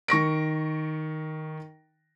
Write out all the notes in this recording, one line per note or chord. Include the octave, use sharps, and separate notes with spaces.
D#3 C#6 A#6 D7